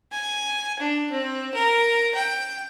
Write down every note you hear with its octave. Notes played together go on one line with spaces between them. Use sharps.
G#5
D4
C4
A#4
G5